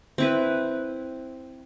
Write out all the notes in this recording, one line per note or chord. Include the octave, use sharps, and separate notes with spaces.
C4 E4 B4